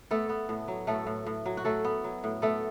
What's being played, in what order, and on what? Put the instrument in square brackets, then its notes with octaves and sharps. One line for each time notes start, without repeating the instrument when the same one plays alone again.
[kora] A3 B3 A4
B3
A2
F#3
A2 A3 A4
A2
A2
F#3
F#4
F#3 A3 A4
B3
F#3
A2
A3 B3 A4